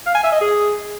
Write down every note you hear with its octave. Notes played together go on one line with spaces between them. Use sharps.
F5
G#5
E5
D#5
G#4